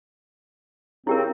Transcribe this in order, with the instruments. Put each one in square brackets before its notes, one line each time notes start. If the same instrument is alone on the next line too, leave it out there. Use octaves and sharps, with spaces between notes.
[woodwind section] C#3 C4 [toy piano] E4 G4 A#4